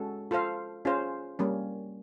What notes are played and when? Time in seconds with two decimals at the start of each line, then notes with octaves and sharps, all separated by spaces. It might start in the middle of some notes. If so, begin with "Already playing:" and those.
Already playing: G#3 C#4 F#4 A4
0.31 F4 A4 C5 F5
0.85 C#4 F4 G#4 C5 F5
1.39 G3 A#3 C#4